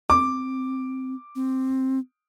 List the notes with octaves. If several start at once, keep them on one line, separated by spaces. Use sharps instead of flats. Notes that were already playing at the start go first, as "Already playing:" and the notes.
C4 D6
C4